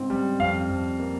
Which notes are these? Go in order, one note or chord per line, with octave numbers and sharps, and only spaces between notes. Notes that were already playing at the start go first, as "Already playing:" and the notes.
Already playing: G#2 C#3 C4 C#4
G3
F2 F5
F2
A#3